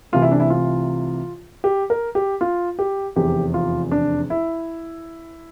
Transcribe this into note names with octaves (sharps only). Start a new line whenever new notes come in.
C2 C3 E3 A3 F4
E4
D4
E4
F4
G4
A#4
G4
F4
G4
F1 E2 C3 G4
F4
D4
E4